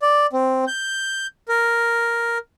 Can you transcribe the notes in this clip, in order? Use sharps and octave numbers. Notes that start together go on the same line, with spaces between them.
D5
C4
G6
A#4